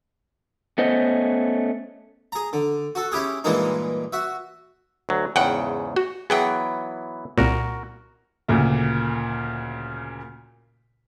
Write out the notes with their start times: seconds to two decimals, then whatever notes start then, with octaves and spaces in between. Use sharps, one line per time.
0.78 A3 B3 C#4 C5 D#5
2.32 G#4 A#5
2.53 D3
2.95 F#4 A4
3.12 C#4 E4 G4 G#4
3.44 G2 A#2 E3 G#3 A#3 D#4
4.13 F#4 E5
5.09 D2 F#3
5.36 E2 G#2 C#3 F#5 G5 F#6
5.96 F#4
6.30 E3 F#3 B3 G#4 F#5 G5
7.38 C2 A#2 F#4 A#4
8.48 D2 A#2 C#3